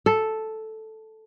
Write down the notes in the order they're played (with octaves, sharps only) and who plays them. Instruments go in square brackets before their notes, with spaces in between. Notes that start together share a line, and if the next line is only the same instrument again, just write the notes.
[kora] A4